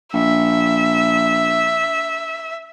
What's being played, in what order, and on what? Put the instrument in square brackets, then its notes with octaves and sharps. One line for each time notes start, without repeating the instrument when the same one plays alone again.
[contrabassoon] A#1 [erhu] E5